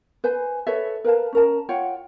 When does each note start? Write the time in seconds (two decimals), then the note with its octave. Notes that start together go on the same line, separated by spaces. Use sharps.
0.24 B4 C5 G#5
0.67 A4 B4 C#5 E5
1.04 A#4 B4 F5 A5
1.33 C#4 A#4 A5
1.69 F4 C#5 F#5 G5